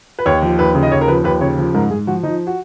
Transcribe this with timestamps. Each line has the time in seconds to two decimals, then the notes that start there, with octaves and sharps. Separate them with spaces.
0.19 B4
0.26 D#2 C#5
0.42 F3
0.59 D#2 B4
0.75 C#3
0.83 D#5
0.92 D#2 C#5
1.01 A#4
1.08 F3 B4
1.24 D#2 B4
1.41 C#3 C#5
1.58 F3
1.74 G#2 A#4
1.91 G#2 G#4
2.07 F3 F#4
2.23 F3 D#4
2.47 F#4